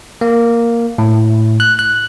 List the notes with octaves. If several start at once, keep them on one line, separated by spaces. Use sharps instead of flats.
A#3
A2
F#6
F#6